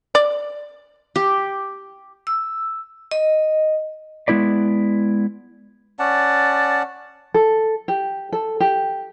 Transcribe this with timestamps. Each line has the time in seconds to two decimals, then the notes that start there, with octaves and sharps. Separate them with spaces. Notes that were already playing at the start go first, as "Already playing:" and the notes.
0.15 D5
1.16 G4
2.27 E6
3.11 D#5
4.28 G#3 B3 E4 B4 D5
5.99 C#4 D5 F#5 A5
7.34 A4
7.88 G4
8.33 A4
8.60 G4